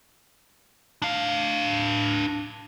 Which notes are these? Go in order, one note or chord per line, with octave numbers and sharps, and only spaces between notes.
D4 F5